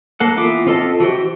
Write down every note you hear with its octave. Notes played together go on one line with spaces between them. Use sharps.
A#3 A4 F#5
E3 B3 F4 D6
C4 F4 A4 D#5 A5
E3 F#4 G4 C5